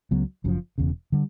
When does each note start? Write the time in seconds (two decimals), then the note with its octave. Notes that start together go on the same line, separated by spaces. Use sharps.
0.11 C#2 C#3 F#3 B3
0.44 F#1 F#2 C#3 F3
0.78 E1 E2 C#3
1.12 D3 G3